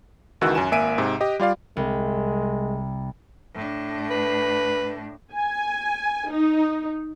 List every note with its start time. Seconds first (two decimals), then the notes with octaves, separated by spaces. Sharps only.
0.41 C#2 D#3 E3 F#4 E6 F#6
0.55 F#2 G#5 E7
0.71 G#1 A#3 E5 G#5 D7 D#7
0.98 G#2 C3
1.21 G4 D#5
1.40 G3 F4 D5 F5
1.77 C2 G#3
3.54 A2 D4
4.10 B4
5.33 G#5
6.31 D#4